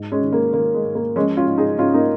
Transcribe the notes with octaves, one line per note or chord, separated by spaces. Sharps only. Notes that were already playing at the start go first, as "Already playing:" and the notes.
Already playing: G#2
G#3 C#4
D#3
A#3
D#3 A#3
G#3
G#2
A#3
F3 G#3 C#4
C#4 F4
G#2
D#4 G#4
G#2 C#4 F4
A#3 D#4